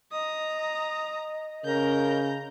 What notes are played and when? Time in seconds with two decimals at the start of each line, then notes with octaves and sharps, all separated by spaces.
0.12 D#5 A#5 D#6
1.65 C#3 A#4 A#5 G6